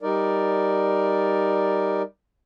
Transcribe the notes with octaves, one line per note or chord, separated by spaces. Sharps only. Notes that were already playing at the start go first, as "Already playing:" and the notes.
G3 D#4 A#4 D5